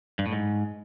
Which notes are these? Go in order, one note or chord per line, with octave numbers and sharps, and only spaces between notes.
G2
A2
G#2